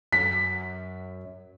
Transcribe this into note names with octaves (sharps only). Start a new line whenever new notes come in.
F#2 B6